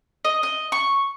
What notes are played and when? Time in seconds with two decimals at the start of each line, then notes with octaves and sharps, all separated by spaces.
0.25 D#5
0.43 D#5
0.72 C#6